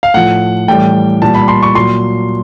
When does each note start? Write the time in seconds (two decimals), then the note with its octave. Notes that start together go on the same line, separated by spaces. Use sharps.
0.03 F5
0.14 A2 F3 F#5
0.68 A2 E3 G3 G5
1.22 A#2 G3 A5
1.35 B5
1.48 C6
1.63 C#6
1.75 A#2 F#3 C6